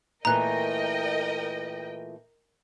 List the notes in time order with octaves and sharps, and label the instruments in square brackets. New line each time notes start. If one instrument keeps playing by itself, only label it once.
[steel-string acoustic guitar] A#2 E3 A3 [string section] A#4 D#5 G5 [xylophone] A#5 F#6